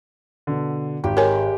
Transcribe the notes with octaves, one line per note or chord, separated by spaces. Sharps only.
B2 D3
G#1 G4
G#3 G4 A#4 C#5 G#5